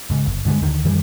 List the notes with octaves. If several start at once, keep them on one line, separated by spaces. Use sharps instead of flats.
C#2 G#2
G1
G2 D3 F3 G#3
D2 D3 D#3
F#2 D#3 E3 G3